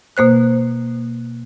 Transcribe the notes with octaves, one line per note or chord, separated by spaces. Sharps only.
B2 A#3 C5 F#6